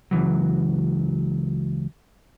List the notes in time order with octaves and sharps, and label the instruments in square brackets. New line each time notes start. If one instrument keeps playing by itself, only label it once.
[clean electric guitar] C#2 A2 E3 F#3